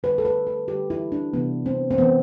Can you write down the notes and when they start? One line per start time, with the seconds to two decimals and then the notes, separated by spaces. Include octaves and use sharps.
0.03 D3 G3 B4
0.18 A4
0.25 B4
0.47 A4
0.68 D3 G3 G4
0.90 E4
1.12 D4
1.33 C3 E3 G3 B3
1.66 C4
1.91 C4
1.98 C3 E3 G3 B3